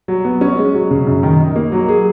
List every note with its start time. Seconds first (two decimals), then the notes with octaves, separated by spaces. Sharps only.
0.08 F#3
0.25 B3
0.41 C#4
0.58 G#3
0.74 F#3
0.91 C#3
1.07 F#2
1.23 D#3
1.40 D#4
1.56 A#3
1.72 F#3
1.89 G#4